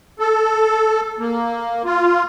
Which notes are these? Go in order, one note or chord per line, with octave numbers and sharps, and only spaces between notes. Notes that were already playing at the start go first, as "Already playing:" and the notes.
A4
A#3
F4